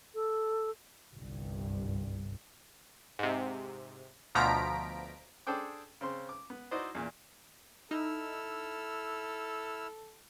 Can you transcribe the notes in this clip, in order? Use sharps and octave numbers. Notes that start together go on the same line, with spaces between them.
A4
G1 C2 G2
G#2 C3
D2 B2 F3 A#5 B6 D7
D4 G#4 A4 C5 G5 D6
C#3 C4 C6
D6
B3
D#4 E4 F#4 C5 D5 D#5
E2 A#2
D#4 E4 A4 E6 F6